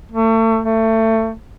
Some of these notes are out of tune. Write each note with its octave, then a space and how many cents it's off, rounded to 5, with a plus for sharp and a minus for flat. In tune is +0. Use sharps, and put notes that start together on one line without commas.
A3 +35
A3 +25